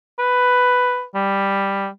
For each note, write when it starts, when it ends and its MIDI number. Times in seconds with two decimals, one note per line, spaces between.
0.19 1.04 71
1.15 1.88 55